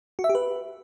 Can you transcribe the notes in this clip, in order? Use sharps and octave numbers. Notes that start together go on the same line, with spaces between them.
F#4
E5
G4
B4